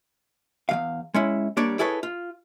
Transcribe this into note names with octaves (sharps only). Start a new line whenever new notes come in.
E2 E3 F5
G#3 C#4 E4
G3 A#3 D4 C#5 D5
E4 G#4 A4 B4 C#5
F4